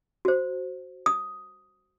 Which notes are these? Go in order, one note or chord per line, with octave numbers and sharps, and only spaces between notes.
F#4 C5
D#6